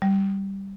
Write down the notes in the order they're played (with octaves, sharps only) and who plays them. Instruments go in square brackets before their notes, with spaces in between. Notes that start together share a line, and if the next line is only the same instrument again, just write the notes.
[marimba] G3